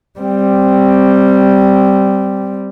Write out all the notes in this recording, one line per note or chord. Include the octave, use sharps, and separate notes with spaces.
G3 C4